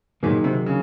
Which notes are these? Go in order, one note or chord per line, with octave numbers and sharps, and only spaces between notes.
A#2 D#3 F#3 A#3 D#4 G#4
C3
C#3